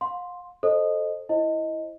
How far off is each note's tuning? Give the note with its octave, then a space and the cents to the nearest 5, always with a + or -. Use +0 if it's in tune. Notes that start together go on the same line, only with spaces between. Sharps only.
F5 +35 C6 +0
A4 +0 C5 +15 D#5 -10
E4 +0 C5 +25 D#5 +10